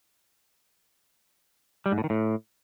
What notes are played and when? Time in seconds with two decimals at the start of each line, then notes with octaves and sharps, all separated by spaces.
1.86 G3
1.92 G#2
1.98 A2
2.04 D#3
2.10 A2